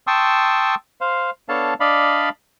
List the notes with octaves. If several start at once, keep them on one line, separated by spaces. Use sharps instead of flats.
G5 A5 C6 C#6 D#6 E6
C5 F5
B3 D4 A4 C#5 F5 A5
D4 D5 D#5 F5 B5